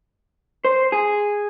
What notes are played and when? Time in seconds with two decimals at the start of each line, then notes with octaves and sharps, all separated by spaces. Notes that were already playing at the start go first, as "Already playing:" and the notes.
0.65 C5
0.92 G#4